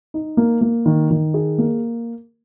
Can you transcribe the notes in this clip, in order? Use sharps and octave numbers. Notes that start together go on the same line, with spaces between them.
D#4
A#3
A#3
D#3
D#3
G#4
A#3